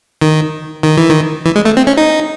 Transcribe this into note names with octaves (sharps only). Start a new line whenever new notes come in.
D#3
D#3
E3
D#3
E3
G#3
A3
C4
C#4
D#4